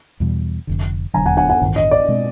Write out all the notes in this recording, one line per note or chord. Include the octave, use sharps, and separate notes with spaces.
E2 B2 G3
F1 F2 D3
E1 D#2 D3 F#3 G#5 A#5
F#5 G#5
F#5 G#5
F#5 G#5
A1 G2 D#3
D#5
D5
B2 G#3 C4